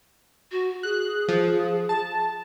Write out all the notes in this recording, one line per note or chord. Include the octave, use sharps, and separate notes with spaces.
F#4
G#4 F#6
F3
A5